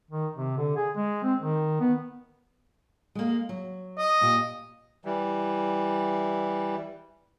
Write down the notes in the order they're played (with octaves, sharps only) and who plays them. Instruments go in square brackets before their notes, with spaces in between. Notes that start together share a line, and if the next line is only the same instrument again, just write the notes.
[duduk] D#3
C3
D3
G#4
G#3
C4
D#3
B3
[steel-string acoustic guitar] G#3 A#3
F#3
[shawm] D#5
[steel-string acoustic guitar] A#2 G4
[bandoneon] E3 G3